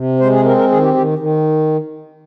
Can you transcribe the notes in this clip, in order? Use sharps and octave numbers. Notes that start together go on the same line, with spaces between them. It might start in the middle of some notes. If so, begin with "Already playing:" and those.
Already playing: C3
G#3 C5
G#4
C4 A#4
A#4
D#3 G#4
G4
D#3 G4
D#3